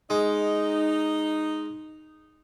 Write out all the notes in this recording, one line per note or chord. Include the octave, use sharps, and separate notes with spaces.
G#3 D#4